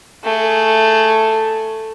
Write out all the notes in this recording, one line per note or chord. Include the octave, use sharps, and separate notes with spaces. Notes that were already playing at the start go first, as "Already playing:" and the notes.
A3 G#4